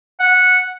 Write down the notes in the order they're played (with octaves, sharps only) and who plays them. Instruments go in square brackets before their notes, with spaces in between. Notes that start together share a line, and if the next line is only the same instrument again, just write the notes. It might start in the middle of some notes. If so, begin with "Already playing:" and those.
[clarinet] F#5